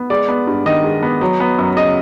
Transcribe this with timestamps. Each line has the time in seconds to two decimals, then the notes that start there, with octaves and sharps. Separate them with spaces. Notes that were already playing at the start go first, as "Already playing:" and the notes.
Already playing: B3
0.10 G#3 D5
0.28 B3
0.47 G2
0.66 D#3 D#5
0.84 G#3
1.03 B3
1.21 F#3
1.40 B3
1.58 F#2
1.77 C#3 D#5